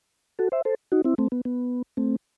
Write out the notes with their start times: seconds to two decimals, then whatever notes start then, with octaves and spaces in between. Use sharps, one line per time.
0.39 F#4 A4
0.52 C5 E5
0.65 A4 C5
0.92 D#4 F#4
1.05 C4 E4
1.18 A3 C4
1.32 B3
1.45 B3
1.97 A3 C4